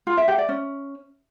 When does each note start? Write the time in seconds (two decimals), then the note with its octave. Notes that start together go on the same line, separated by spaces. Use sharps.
0.07 F4
0.17 E5
0.28 G4
0.38 D5
0.49 C#4